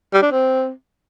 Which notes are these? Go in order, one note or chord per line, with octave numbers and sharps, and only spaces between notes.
G3
D4
C4